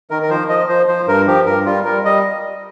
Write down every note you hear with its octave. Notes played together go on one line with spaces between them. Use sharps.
D#3 A#4
A#4
F3 C5
F3 D#5
F3 C5
F3 C5
G2 A#4
F3 G4
G2 A#4
G3 F4
G3 A#4
G3 D#5